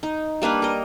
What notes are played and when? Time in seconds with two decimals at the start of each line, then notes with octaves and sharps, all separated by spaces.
0.03 D#4
0.42 G3 A#3 D4 B4
0.62 A#4 D#5